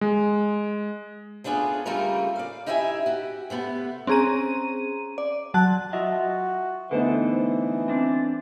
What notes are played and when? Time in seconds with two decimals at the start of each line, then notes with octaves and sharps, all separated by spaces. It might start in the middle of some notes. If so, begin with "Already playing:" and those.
0.01 G#3
1.44 A3 B3 D4 F4 G#4
1.86 C#3 G3 A3 A#3 F4 A#4
2.36 D5 F5
2.66 D#4 E4 G4 E5 G5 G#5
3.06 F#4 G4
3.50 C3 A3 B3
4.07 C4 C#4 G#4 A#5 D#7
5.18 D5
5.54 F#3 A5 F#6
5.93 F4 F#4 D#5 E5
6.91 D3 E3 A3 B3 D#4 C5
7.88 C4 D4